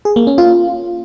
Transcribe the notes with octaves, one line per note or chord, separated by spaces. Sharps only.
G#4
A#3
C#4
F4